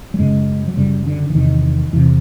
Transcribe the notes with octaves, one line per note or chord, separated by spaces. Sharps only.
G3
F#2 C#3 G#3
F#3
F#2 C#3 G3
D3
E3
E2 C3 D#3
E2 C3 E3